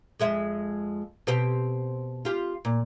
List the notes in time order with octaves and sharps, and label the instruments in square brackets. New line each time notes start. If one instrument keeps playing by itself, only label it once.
[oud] F2 G#3 E5
B2 C4 G4
F4 G4
A#2